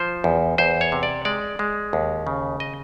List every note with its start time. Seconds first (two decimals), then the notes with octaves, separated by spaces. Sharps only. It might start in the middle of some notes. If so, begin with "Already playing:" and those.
Already playing: F3 C5
0.24 E2
0.58 E2 C5
0.81 C#5
0.92 C3
1.03 D5
1.25 G#3 D5
1.59 G#3
1.93 D#2
2.27 C#3
2.60 D#5